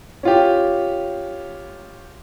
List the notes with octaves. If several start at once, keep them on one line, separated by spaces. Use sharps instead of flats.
C#4 F4 G4